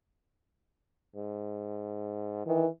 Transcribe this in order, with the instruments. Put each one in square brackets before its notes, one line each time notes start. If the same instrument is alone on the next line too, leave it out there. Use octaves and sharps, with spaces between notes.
[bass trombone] G#2
[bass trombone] D#3 [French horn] E3